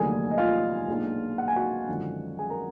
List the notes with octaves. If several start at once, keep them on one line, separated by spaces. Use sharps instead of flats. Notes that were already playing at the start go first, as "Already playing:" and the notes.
Already playing: F1 D#2 D3 F#3 A#3 G#4 G#5
D#5
F4 F5
B1 A#2 G#3 D4
F#5
G#5
F#4 F#5
G#1 F#2 D3 F3
G#4 G#5
A#4 A#5